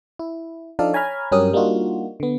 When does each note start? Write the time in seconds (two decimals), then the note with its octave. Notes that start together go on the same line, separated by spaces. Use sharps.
0.19 E4
0.79 F3 D4 D#4 A4 D5 F5
0.93 C#5 G#5 A#5 B5 F6 G#6
1.32 G2 F#3 C#4 G4 A#4 D#6
1.53 G3 A#3 D4 D#4 F4 F#4
2.20 D3 B3